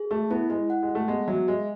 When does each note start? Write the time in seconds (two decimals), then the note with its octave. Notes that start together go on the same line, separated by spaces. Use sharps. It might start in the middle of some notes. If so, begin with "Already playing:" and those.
Already playing: G#4
0.11 A3 E5
0.31 B3 E4
0.50 G#3 E4
0.70 F#5
0.83 G#3
0.89 F#5
0.95 A3
1.08 G#3 B3
1.28 F#3 E5
1.48 G#3 B4